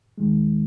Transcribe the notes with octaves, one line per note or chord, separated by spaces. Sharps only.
D#2 D#3 G#3